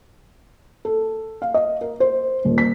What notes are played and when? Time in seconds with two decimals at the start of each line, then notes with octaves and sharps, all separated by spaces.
0.85 A4
1.42 F5
1.54 D#5
1.81 A#4
2.00 C5
2.45 D#1
2.58 B6